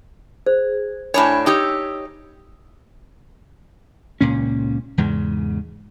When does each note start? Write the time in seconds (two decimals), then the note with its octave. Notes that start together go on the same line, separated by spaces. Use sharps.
0.46 G#4 C5
1.14 A2 D4 C#5 G#5 A5 B5
1.46 D#4 G4 C#5 E6
4.21 C#2 A#2 C#4
4.98 E2 G#2 C#3